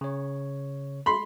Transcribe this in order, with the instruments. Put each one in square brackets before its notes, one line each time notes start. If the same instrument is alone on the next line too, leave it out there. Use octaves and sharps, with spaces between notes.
[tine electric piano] C#3 C#5
[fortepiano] B5 C6